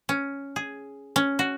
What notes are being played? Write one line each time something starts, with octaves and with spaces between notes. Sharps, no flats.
C#4
G#4
C#4
F#4